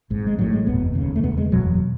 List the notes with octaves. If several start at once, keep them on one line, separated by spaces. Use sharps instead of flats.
G#1 G#2
G#3
A1 A2 F#3
G#3
F#1 E2 B2 B3
E1 D#2 C#3
A3
E1 E2 C#3 B3
G#3
F#1 E2 B2 F#3